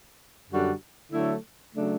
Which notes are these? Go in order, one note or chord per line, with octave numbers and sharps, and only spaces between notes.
F#2 D3 G3 D4 F#4
D3 F#3 A3 E4
C#3 F#3 A3 D4